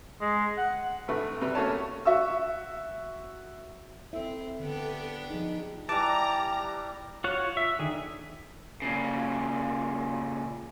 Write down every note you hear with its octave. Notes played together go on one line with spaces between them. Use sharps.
G#3
F#5
G#1 G2 C3 A3 B4
C3 G3 B4
A3 A#3 C#4 F#4 C#5 A5
F#4 E5 C#6 E6
C4 E4 A4 E5
D3 B3 D4 G4
F3 D#4 G#4
E3 G3 G4 A5 A#5 D6
F4 F#4 C#5 F#5
E5
D3 D#3 G#4
A#2 C#3